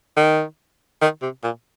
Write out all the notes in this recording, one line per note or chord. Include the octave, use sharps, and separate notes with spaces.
D#3
D#3
C3
A#2